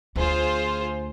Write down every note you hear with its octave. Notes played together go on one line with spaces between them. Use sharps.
D2 F4 G#4 C5